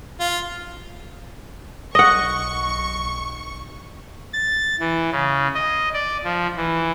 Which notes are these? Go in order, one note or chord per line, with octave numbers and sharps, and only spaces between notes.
F4
B1 D#5 F#5 C#6
A6
E3
C#3
D#5
D5
F3
E3